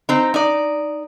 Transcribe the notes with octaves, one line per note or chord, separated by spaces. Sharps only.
C4 D#4
D#4 D5